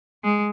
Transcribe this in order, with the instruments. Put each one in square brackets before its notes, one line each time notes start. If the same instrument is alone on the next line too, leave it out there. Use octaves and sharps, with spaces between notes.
[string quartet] G#3